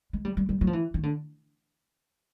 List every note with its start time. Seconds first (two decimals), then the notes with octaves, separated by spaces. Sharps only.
0.13 G#3
0.25 G3
0.37 G3
0.49 G3
0.61 F#3
0.67 F3
0.73 E3
0.94 D#3
1.03 D3